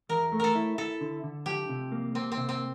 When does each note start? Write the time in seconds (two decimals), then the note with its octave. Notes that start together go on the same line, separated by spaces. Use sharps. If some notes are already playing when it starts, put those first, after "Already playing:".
0.09 E2 A#4
0.32 A3
0.40 A4 A#4
0.55 E4
0.78 E4 A4
1.01 D3
1.24 D3
1.46 F3 G4
1.69 C3
1.92 A#3
2.15 A#3 C4
2.32 C4
2.37 C3
2.49 C4